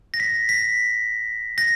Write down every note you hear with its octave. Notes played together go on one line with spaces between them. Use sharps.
A#6
B6
B6
A#6